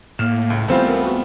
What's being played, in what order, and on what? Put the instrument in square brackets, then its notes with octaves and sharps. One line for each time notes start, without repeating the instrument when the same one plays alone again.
[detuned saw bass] A2 [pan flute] A#3 [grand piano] F6 [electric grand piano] E7
[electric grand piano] C#2
[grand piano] C#2 E3 G3 [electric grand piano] A3 C4 F4 [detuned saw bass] B3 [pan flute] C5
[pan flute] A#4
F#4